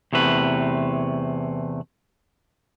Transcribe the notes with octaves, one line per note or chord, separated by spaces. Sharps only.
E2 C3 A3 B4